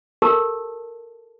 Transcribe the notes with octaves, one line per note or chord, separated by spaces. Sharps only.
G4 A4 A#4 A5